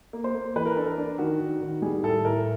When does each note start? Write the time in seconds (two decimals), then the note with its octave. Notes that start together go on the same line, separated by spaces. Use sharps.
0.13 A#3
0.24 C5
0.34 A#3
0.56 E3 B4
0.66 A#4
0.76 D4 A4
0.87 A#4
0.98 D4
1.18 D#3 F#4
1.40 D#3
1.61 D#3
1.82 G3 G#4
2.03 A2 A4
2.25 A2 A#4